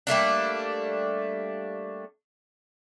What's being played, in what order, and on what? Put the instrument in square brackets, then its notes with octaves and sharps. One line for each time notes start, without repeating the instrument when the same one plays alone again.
[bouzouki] G3 A3 A#3 D4